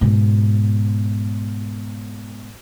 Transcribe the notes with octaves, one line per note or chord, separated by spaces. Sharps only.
G#2 B2